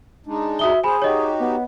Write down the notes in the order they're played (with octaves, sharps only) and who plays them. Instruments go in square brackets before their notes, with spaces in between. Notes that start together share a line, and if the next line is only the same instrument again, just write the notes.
[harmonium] G#3 D4 D#4
[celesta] F#4 D#6 G7 [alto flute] E5
[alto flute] G#4 [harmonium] C5 [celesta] G#5 B5
[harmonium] D#4 F#4 G4 [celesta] C#5 D#5
[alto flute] B3